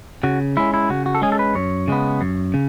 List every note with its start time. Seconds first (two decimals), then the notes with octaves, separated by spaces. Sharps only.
0.23 C#3 F#4
0.57 G#3 C#4 E4
0.74 E4
0.90 C#3 F#4
1.06 F#4
1.15 A4
1.22 G#3 C#4 G#4
1.32 A4
1.39 B4
1.55 F#2 C#5
1.88 C#3 G#3 B3
2.21 F#2
2.54 C#3